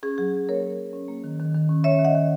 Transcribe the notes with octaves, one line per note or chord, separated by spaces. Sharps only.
C#4 G#4
F#3 G#4
C#4
A#3 A#4 C#5
A#3
F#3
C#4
A#3
D#3
D#3
D#3
C#4
C#4 C#5 E5
D#3
D#5 F#5
D#3